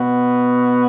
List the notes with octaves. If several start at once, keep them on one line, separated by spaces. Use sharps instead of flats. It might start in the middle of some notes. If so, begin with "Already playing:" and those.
Already playing: B2 B3